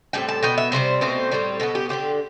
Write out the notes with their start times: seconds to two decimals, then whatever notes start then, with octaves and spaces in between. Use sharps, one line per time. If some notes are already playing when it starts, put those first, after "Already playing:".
0.13 A2 G3 C4 G5
0.28 A5
0.42 B2 B3 G5
0.58 E5
0.72 C3 G3 C4 C5
1.01 B2 A3 C4 C5
1.31 A2 G3 C4
1.60 B2 B3 A4
1.75 G4
1.89 D3 F3 C4 G4